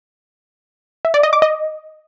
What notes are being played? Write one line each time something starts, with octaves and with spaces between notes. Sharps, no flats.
E5
D5
D#5
D6
D#5